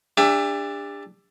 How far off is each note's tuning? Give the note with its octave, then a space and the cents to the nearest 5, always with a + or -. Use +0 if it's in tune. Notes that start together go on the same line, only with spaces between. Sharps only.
D4 +0 G4 +45 E5 +20